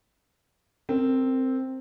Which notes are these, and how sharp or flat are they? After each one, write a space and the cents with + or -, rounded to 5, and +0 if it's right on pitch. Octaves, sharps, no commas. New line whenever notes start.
C4 +0 A#4 -25